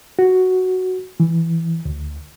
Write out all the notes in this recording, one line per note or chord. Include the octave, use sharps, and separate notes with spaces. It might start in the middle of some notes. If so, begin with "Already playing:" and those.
F#4
E3
D2